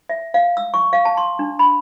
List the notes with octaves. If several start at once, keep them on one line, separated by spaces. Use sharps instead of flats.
E5
F5
E6
C#6
F5
A5
C6
D4
B5